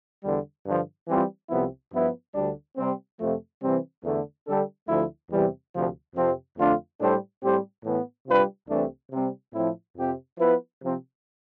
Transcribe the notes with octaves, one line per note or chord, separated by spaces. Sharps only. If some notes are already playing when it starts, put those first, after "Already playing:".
E2 D3 G3
G2 D3 F3
E3 G3 C4 F4
C2 C3 F3 B3 E4
G2 F3 B3 E4
D2 D3 G3 D4
C3 G3 C4
F2 C3 F3 A3
C3 E3 G3 C4
E2 D3 A3
D3 G3 D4 A4
D2 D3 F3 A3 E4
E2 C3 E3 G3
D2 C3 F3
F2 C3 F3 C4
F2 D3 A3 D4 F4
A2 G3 D4 A4 C5
A2 G3 C4 G4 C5
A2 E3 B3
C3 G3 D4 F4 B4
C2 C3 E3 A3 D4
C3 G3 C4
A2 F3 C4 E4
F2 C3 F3 C4 G4
F3 B3 E4 B4
C3 F3 C4